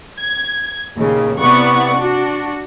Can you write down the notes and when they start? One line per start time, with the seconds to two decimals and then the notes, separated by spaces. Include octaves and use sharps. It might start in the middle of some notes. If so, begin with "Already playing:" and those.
0.19 G#6
0.99 D#2 A#2 C#3
1.40 C3 B3 E4 D5 F#5 C#6
1.97 D4 F#4